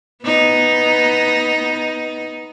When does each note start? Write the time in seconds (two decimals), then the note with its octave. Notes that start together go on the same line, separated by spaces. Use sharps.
0.22 B3 D#4